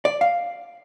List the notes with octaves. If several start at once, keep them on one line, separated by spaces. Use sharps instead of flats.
D5
F5